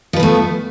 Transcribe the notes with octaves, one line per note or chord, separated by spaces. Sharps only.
F3 A3 B3 B4